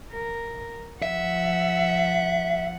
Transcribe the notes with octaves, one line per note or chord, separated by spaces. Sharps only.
A#4
F3 E5 F#5